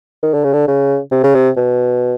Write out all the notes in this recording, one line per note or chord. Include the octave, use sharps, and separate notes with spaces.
D#3
D3
C#3
D3
C#3
C3
C#3
C3
B2